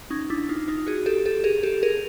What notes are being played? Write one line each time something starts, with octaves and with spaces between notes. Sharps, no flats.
C#4 D#4
D4 E4
D#4 F4
D#4 F4
F#4 G#4
G4 A4
G4 A4
G#4 A#4
G4 A4
G#4 A#4